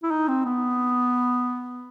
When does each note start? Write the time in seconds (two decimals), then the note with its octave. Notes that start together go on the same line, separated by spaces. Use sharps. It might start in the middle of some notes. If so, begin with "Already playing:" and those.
0.03 E4
0.11 D#4
0.28 C4
0.45 B3